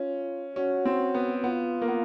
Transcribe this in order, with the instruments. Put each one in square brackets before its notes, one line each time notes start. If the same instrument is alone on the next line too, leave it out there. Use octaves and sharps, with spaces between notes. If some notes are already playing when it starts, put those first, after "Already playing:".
Already playing: [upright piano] C#4 [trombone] F4
[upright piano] C#4 [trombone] F#4
[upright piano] C4
B3
[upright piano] B3 [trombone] F4
[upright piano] A#3
B3